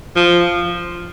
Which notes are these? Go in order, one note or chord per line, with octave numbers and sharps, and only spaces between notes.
F3